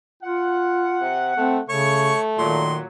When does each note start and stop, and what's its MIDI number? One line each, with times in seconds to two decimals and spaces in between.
0.23 1.11 65
0.23 1.62 78
1.01 1.32 48
1.37 1.60 57
1.37 1.59 60
1.69 2.13 49
1.69 2.83 57
1.69 2.20 73
1.69 2.20 85
2.38 2.87 46
2.38 2.79 51
2.38 2.87 54
2.38 2.76 84